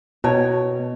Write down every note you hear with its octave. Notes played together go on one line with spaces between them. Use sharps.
B2 C#4 E4 C#5 A5